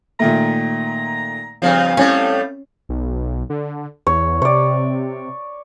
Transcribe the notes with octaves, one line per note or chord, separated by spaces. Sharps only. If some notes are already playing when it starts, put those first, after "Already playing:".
A#2 D#3 A3 A#5
G2 C#3 F3 C4 F5
A2 G3 A3 C#4
B1
D3
E2 C#5
C3 C#5 D5